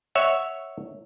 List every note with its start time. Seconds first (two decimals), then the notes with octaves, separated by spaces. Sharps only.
0.15 C#5 E5 F#5